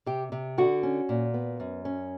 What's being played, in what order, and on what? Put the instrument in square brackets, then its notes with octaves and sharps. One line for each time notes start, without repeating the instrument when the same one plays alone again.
[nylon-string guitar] C3 G4
C3
D3 F#4
C#4
A#2
B3
F#2
C#4